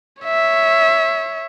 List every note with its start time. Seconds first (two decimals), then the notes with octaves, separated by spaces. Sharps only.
0.23 C#5 E5